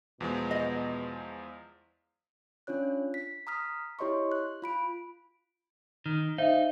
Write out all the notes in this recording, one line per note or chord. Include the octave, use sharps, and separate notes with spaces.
E2 B2 F3 G#3
D#5
C#4 D4 F4 C#5 F#6
B6
A#5 D#6 F6 B6
E4 G4 C#5 D#5 C6 C#6
F#6
F4 B5 D7
D#3 F6
D#4 C5 E5 F5